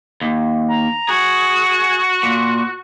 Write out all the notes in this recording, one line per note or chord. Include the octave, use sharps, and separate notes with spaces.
D#2
A#5
F#4 G#4
A#2